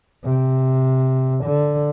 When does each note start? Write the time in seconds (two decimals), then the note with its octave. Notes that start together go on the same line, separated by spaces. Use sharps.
0.25 C3
1.45 D3